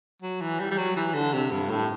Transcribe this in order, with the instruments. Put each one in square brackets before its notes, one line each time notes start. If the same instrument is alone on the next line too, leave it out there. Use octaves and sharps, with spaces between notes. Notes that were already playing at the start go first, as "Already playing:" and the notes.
[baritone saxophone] F#3
E3
G3
G3
F#3
E3
D3
C3
G2
A2